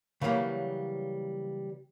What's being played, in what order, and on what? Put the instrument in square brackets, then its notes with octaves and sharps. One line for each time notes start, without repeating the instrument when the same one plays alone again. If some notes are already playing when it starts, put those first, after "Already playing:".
[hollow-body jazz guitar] C#3 E3 F#3 G3 A#3